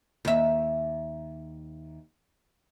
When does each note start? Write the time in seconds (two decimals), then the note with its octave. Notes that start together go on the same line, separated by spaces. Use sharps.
0.25 D#2 E5